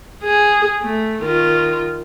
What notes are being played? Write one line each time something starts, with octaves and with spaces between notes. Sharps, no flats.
G#4
A3
D#3 F4